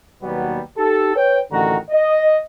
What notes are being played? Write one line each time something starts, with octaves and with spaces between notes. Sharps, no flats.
D#2 B2 F#3 G3 B3
D#4 G4 A4
B4 C#5 G5
A1 D3 D#3 F#4 A#5
D#5